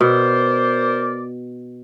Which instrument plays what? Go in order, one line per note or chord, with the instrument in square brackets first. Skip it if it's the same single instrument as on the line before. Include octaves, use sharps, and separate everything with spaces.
[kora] B2 [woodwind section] A#4 C5 D5